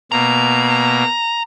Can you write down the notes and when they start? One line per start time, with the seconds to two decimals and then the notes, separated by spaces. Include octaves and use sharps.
0.12 B2 A#3 A#5